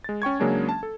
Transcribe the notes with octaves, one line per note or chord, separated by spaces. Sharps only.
G#3 A6
C#4 G5 C#6 G#6
C#3 F#3 G#3 A#3 C#4 D4
A5
A4